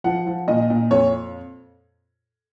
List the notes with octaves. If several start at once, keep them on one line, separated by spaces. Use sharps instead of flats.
F3 F#5
F3
A#2 D#5
A#2
F2 C#5